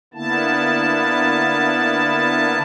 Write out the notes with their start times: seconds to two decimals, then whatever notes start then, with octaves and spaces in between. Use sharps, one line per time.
0.14 D3 A#3 B3 E4 A5